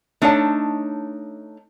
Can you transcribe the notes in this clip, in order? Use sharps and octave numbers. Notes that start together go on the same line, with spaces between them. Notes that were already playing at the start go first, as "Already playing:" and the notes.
A3 D4 D#4 C#5 F5 A5